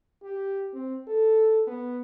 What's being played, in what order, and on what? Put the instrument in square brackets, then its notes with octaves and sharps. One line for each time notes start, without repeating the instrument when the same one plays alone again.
[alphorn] G4
C4
A4
B3